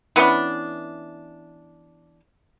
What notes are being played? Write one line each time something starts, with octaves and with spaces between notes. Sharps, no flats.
E3 B3 C#4 D4